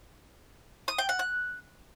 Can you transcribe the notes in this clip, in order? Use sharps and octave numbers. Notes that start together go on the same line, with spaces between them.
D#6
G5
F#5
F#6